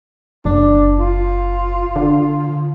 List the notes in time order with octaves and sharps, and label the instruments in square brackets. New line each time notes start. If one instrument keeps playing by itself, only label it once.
[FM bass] F#1 [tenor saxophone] D4
[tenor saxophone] F4
[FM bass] D3